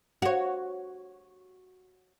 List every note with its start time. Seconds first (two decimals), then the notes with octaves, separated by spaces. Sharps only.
0.22 F#4 C#5